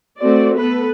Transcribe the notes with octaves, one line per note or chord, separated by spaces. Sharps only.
A3 C4 F#4 D5
B3 A4 B4